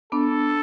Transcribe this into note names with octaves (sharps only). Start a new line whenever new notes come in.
B3 D4 A4